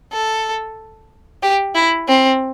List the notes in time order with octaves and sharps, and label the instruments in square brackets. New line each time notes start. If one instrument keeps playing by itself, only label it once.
[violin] A4
G4
E4
C4